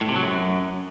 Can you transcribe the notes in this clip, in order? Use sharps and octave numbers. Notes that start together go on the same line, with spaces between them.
A2
C3
F#3
F#2